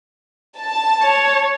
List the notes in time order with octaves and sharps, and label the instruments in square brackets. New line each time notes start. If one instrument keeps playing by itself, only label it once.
[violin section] A5
[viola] C#5